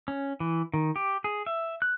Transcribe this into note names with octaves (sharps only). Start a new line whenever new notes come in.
C#4
E3
D#3
G4
G#4
E5
F#6